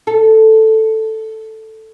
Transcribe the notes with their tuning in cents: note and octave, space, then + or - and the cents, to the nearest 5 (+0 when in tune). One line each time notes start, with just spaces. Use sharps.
A4 +0